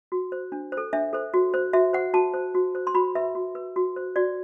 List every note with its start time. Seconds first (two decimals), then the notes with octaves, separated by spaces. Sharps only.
0.12 F#4
0.32 C5
0.52 D4
0.72 C5
0.77 A4
0.93 D4 E5
1.13 A4 C5
1.34 F#4
1.54 C5
1.73 F#4 E5
1.93 C5 F#5
2.14 F#4 A5
2.34 C5
2.54 F#4
2.75 C5
2.87 C6
2.94 F#4 B5
3.15 B4 E5
3.35 F#4
3.55 B4
3.76 F#4
3.96 C5
4.16 F#4 D5